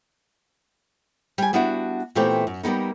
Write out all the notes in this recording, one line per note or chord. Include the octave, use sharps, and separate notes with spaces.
G3 G#5
G3 B3 D4 E4 F#4 F#5
A#2 E3 A3 B3 C4 G4
F#2
G3 A#3 B3 D#4